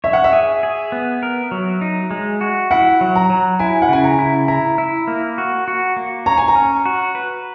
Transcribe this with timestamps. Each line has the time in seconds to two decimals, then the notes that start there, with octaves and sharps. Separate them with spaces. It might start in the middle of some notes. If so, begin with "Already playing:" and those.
0.04 C#5 E5
0.13 F#5
0.24 E5
0.33 G#4
0.63 G#4
0.92 B3
1.23 A#4
1.51 F#3
1.81 D#4
2.11 G#3
2.41 F#4
2.71 E4 F#5
3.01 F#3
3.16 A#5
3.30 F#3
3.59 E4 G#5
3.82 F#5
3.89 C#3 G#5
4.04 A#5
4.19 E4
4.48 E4 A#5
4.78 E4
5.08 A#3
5.38 F#4
5.68 F#4
5.97 A#3
6.26 C#5 A#5
6.38 G#5
6.48 A#5
6.55 C#4
6.86 F#4
7.15 B4